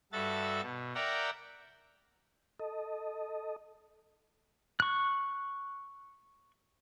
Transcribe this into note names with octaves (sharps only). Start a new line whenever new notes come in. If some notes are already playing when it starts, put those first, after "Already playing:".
G2 F#4 A4 E5 A6
B2
A#4 D5 E5 F#5 G5 A#5
A4 D#5
C#6 F#6